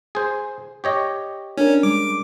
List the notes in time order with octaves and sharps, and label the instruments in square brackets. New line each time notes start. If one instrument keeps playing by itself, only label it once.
[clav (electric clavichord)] G#4 C5
G4 C#5 D#5
[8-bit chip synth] C#4 [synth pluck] D4 A#4
[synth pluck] G3 G#3 [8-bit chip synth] D6